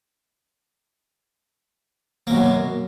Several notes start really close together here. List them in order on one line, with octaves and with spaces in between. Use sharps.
A#3 B2 F#2